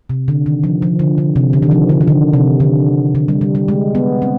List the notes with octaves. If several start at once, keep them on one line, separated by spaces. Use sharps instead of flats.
C3
D3
D#3
F3
F3
D3
D3
C3
D3
D#3
F3
D3
D#3
D3
C3
D3
D3
G3
G3
G3
G#3
B3
C4